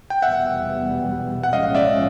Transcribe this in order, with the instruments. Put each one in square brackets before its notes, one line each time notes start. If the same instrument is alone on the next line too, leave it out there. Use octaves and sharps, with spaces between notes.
[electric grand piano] G5
[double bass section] F1 E2 B2 G3 B3 [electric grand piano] E5 F#5
[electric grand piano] F#5
[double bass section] B1 A2 F3 G#3 C#4 [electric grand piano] D#5 F5
[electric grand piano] D5 E5